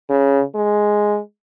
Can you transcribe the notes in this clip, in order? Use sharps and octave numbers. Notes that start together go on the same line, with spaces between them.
C#3
G#3